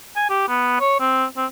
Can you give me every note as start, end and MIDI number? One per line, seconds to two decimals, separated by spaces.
0.16 0.27 80
0.30 0.45 67
0.49 0.78 59
0.80 0.97 73
1.00 1.25 60
1.37 1.46 60